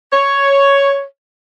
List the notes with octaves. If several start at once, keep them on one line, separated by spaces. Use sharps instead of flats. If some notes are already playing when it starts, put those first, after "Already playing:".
C#5